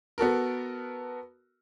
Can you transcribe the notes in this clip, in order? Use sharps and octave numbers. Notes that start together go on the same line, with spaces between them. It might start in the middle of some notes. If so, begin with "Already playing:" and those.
B3 F#4 A4 A#4